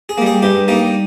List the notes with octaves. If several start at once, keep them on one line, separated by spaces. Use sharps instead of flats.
G#4
G3 A#3
G#4
G2 G4
G3 A#3 D#4